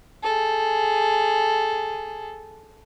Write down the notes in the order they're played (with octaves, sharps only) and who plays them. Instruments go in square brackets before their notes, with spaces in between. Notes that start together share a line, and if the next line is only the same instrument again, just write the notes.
[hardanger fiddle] G#4 A4